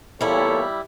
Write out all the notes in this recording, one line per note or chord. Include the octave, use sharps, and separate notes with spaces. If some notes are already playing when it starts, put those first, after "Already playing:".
E2 A#2 G3 E4 A4 C#5